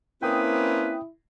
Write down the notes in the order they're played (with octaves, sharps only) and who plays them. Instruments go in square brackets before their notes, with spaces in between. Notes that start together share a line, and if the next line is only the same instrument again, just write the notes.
[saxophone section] A#3 C4 C#4 [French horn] E4 [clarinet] B4 [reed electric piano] G5 D#6